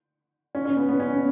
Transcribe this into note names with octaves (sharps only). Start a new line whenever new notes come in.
C#4
C#4
B3
B3
C#4